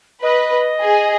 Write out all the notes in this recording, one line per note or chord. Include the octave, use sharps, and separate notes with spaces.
B4 D#5
G#4